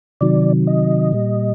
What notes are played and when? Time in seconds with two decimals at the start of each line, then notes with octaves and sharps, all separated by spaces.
0.21 C3 D#3 F#3 D5
0.67 D#5
1.13 A#2 G3